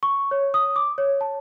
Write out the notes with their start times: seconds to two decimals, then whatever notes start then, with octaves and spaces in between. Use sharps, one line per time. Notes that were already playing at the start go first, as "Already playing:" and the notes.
0.03 C#6
0.31 C#5
0.54 D#6
0.76 D6
0.98 C#5
1.21 A5